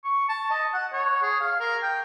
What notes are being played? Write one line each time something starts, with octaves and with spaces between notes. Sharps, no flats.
C#6
A5
D#5
F#5
C#5
G#4
F5
A#4
G5